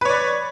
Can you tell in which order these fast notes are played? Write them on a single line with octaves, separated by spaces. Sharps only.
B4 C#5 D5